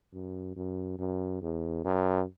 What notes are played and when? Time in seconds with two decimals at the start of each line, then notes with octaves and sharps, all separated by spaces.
0.13 F#2
0.56 F#2
0.98 F#2
1.42 E2
1.84 F#2